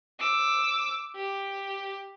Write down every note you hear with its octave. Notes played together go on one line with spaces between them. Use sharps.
D6 E6
G4